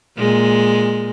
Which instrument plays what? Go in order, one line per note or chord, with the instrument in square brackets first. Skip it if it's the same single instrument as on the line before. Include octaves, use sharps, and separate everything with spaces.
[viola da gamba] A#2 G#3